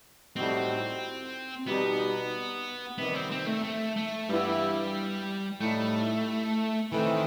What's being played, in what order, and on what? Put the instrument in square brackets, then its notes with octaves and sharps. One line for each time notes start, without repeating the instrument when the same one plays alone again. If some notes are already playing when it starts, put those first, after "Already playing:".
[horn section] A2 G3 D#4 F#4 [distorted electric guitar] C4
[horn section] B2 G3 D#4 [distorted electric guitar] B3
[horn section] C3 D#3 G3 [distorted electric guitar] B3
[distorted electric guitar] C4
C4
A3
A3
A3
[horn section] G2 E3 B3 E4 [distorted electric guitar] G3
[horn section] A2 G3 D#4 [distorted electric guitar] A3
[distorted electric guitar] D#3 [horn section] E3 A3 C4